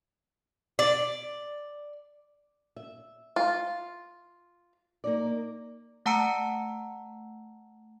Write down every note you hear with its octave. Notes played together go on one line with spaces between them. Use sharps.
D5
E5
F4
A#3 D#4 D5
A3 F#5 A5 A#5 E6 C#7